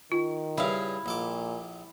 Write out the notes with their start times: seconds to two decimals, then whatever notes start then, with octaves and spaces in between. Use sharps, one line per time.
0.12 D#3 F4
0.58 G2 C#3 E4 F5
1.06 A#1 A#2 A4 D6